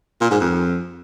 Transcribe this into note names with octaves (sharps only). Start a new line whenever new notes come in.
A#2
G#2
F2